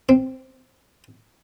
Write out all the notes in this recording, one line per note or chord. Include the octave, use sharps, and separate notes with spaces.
C4